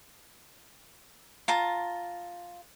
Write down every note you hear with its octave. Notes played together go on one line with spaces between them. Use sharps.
F4 A5 A#5